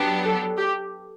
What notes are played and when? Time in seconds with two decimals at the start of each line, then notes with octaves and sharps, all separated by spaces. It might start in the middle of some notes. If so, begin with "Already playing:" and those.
Already playing: F#3 B3 D4 G4
0.24 A4
0.58 G4